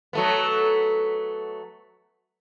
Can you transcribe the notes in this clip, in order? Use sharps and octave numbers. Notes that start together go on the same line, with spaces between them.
F#3 A3 B3